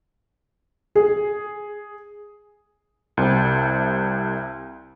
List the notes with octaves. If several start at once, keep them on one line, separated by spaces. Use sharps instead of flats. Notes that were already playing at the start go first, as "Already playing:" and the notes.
G#4
C2 C3